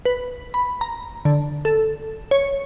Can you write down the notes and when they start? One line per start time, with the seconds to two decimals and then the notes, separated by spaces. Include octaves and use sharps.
0.05 B4
0.54 B5
0.81 A#5
1.25 D3
1.65 A4
2.31 C#5